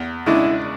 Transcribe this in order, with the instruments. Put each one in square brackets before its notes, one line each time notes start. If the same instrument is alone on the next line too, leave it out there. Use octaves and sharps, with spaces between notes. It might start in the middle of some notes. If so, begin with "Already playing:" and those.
Already playing: [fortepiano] E2
[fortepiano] C#3 G#3 D4 [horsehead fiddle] E4